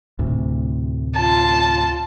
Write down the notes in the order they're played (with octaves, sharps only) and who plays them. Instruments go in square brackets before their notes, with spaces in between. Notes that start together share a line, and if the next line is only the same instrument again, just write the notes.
[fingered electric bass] D2 A2 C3
[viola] F4 [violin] A5